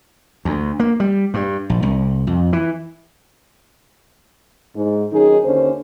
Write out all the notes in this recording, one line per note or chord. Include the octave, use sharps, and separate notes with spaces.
D2
A#3
G3
G2
A#1
C2
F2
E3
G#2
D#3 F#3 C#4 D#4 G#4
D#2 D3 C#4 C5